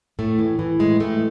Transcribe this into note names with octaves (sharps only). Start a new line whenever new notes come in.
A2 A3
E3
E3
A2 G#3
E3 A3